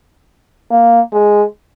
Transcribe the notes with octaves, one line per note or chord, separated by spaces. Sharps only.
A#3
G#3